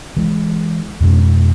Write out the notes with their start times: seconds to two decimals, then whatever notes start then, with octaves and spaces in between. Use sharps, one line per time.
0.17 E3 G#3
1.01 F2 B2 G#3 C#4